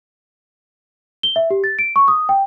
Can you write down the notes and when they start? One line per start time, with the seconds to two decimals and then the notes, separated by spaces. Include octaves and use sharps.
1.23 G7
1.36 E5
1.50 G4
1.64 A6
1.79 D7
1.96 C#6
2.08 D#6
2.29 G5